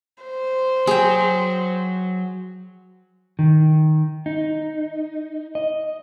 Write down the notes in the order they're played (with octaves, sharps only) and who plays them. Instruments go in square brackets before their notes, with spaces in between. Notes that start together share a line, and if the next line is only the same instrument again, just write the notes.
[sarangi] C5
[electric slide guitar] F#3 [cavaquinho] G#4 G5
[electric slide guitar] D#3
D#4
D#5